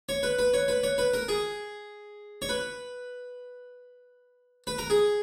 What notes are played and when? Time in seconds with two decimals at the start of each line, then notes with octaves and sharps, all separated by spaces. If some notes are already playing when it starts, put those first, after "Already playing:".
0.09 C#5
0.23 B4
0.39 B4
0.54 C#5
0.68 B4
0.83 C#5
0.98 B4
1.14 A#4
1.28 G#4
2.42 C#5
2.49 B4
4.67 B4
4.78 A#4
4.90 G#4